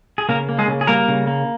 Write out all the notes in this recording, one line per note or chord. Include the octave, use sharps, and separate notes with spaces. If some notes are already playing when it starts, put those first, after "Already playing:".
G#4
C#3 A#3 A#4
A#3
G#3 G#4
C#3
G#4
G3 A#3 A#4
C#3
A#3